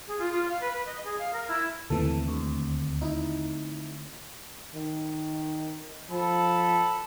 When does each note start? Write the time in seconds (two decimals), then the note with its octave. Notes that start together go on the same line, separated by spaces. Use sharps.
0.08 G#4
0.19 F4
0.32 F4
0.48 F5
0.61 B4
0.72 B4
0.86 D#5
1.04 G#4
1.18 F5
1.33 A#4
1.48 E4
1.90 D#2 D3 E3 A3 C4 A4
2.28 D2
3.01 D#4 E4
4.75 D#3
6.10 F3 A4 B5